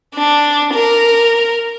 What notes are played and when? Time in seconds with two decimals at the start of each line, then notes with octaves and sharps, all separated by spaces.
0.16 D4
0.74 A#4